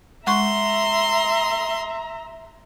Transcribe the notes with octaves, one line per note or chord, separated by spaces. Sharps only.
G#3 E5 A#5 C6 C#6